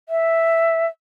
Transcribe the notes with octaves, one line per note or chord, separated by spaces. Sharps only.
E5